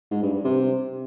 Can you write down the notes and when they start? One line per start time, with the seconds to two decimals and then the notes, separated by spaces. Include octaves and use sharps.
0.11 G#2
0.22 G2
0.33 G2
0.44 C3